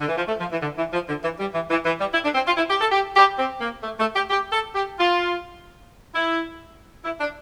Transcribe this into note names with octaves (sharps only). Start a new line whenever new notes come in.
D3
E3
F3
A3
F3
E3
D3
E3
F3
D3
E3
G3
E3
E3
E3
G3
E4
D4
C4
F4
E4
G4
A4
G4
G4
C4
A#3
A3
A3
G4
G4
A4
G4
F4
E4
E4
D4